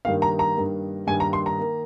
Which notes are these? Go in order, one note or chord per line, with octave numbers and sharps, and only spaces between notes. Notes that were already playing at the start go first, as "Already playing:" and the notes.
G2 D#3 A#3 F5
A#5
A#5
G2 D#3 A#3
G2 D#3 A#3 G#5
A#5
C6
A#5
D#3 A#3